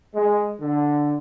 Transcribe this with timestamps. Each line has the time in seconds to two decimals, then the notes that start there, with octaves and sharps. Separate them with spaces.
0.14 G#3
0.60 D3